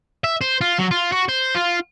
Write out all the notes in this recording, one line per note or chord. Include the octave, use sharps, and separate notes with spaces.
E5
C5
F4
F#3
F4
F#4
C5
F4